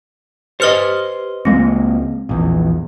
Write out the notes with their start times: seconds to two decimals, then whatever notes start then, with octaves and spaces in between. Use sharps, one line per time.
0.60 G4 B4 C5 D#5 F6
1.45 C#2 G#3 A#3 C4
2.29 A#1 E2